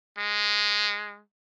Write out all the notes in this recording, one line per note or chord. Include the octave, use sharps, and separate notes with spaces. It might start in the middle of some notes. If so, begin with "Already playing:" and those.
G#3